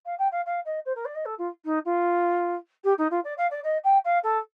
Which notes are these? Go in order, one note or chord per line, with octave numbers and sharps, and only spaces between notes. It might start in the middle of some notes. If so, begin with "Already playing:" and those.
F5
G5
F5
F5
D#5
C5
A#4
D5
D#5
A4
F4
D#4
F4
G4
D#4
F4
D5
F5
D5
D#5
G5
F5
A4